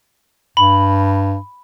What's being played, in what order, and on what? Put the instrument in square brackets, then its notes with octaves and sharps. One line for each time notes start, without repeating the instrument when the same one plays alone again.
[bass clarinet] G2 [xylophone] B5